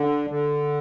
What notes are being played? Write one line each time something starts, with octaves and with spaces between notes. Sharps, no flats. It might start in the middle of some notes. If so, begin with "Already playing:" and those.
Already playing: D3
D3